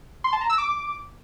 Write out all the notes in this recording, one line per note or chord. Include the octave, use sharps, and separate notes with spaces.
C6
A5
A#5
E6
D6